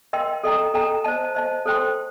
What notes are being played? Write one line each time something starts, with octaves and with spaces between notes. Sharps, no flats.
A#4 D#5 G5 C6
A4 D#5 G5 A#5
A4 D#5 G5 A#5
C5 D#5 A5
C5 D#5 A5
A4 C5 G5 C6